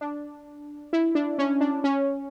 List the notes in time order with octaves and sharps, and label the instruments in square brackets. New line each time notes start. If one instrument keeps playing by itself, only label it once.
[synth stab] D4
E4
D4
C#4
D4
C#4